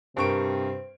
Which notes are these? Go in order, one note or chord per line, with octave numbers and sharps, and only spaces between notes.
G2 C3 C4 G4 A#4 C#6 D7